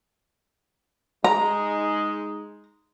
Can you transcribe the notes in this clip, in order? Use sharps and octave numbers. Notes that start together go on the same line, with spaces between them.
G#3 D#4 A#5